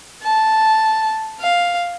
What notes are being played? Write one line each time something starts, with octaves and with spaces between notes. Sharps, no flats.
A5
F5